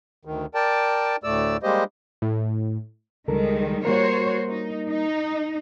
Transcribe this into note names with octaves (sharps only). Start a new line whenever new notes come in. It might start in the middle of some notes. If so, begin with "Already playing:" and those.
D2 D#3
A#4 D5 G5 A5
D2 A2 A3 D5 E6
G3 G#3 A#3 G4 C5 D#5
A2
C#2 D#3 G3 G#3 A4 A#4
G3 A#3 F#4 A#4 C5 C#5
D#4
D#4